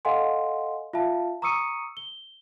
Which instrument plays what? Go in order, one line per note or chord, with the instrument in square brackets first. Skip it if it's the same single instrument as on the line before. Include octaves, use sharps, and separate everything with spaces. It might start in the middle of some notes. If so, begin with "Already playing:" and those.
[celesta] A4 D#5 F5 F#5 G#5 C6
F4 E5 F5 A5
A#5 C#6 D#6 E6 C#7 D#7
G7